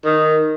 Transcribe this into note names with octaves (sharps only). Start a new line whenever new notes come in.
D#3